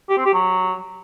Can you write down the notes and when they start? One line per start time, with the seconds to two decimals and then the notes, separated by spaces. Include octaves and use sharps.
0.09 G4
0.17 C4
0.25 G4
0.33 F#3